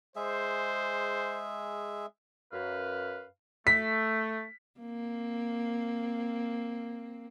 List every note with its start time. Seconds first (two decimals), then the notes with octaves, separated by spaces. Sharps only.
0.16 G#3 G#4 C5 E5
2.52 F#2 B4 F5
3.67 A3 B6
4.80 A#3 C4